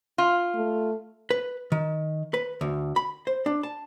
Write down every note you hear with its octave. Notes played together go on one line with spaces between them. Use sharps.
F4
A3
B4
D#3
B4
D2
B5
C5
D4
A5